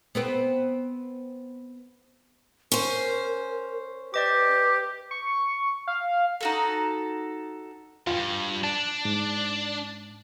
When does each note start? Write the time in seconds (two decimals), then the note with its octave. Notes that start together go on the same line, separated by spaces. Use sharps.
0.15 B3 C4 B4
2.72 C#4 A#4 C5
4.14 G4 B4 D5 D#5 D6
5.11 C#6
5.87 F5
6.41 D#4 F#4 A4
8.07 E2 G2 F4
8.64 D4 A5
9.05 G#2